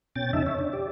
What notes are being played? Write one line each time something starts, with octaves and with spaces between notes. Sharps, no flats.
B2 C#4 G5 A6
F2 C#3 C#4 D#4 E5 A5
C#5 E5
D4
G4 D5